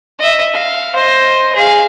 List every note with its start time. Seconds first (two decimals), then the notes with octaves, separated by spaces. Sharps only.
0.19 D#5 E5
0.53 F5
0.95 C5 D#5
1.55 G#4 F5